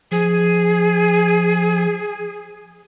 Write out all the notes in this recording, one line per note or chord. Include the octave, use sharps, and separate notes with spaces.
F3 G#4